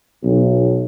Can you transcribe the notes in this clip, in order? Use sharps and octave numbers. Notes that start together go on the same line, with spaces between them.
B1